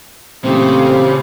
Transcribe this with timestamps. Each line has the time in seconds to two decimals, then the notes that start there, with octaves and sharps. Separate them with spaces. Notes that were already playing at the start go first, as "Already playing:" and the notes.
0.45 A#2 C#3 E3 A3 C4 G4